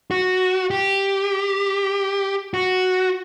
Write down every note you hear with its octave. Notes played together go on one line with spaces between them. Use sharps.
F#4
G4
F#4